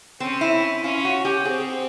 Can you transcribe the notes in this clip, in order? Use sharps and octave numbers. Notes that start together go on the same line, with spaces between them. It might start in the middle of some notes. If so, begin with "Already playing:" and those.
C4 C#4
E4
C#4 F4
F#4
G4
C4 G#4